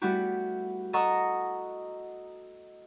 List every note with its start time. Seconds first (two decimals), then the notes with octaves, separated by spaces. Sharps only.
0.02 G3 A3 B3 E4 F#4 G4
0.93 A4 D#5 F#5 A#5 C#6 E6